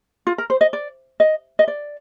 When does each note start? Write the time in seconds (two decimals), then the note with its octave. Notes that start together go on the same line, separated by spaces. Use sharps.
0.27 F4
0.38 A#4
0.50 C5
0.61 D#5
0.73 D5
1.20 D#5
1.59 D#5
1.68 D5